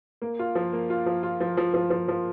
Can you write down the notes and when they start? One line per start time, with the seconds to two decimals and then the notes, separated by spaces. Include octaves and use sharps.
0.22 A#3
0.39 F4
0.55 F3
0.73 A#3
0.90 F4
1.06 F3
1.23 F4
1.41 F3
1.57 F3
1.74 F3
1.90 F3
2.08 F3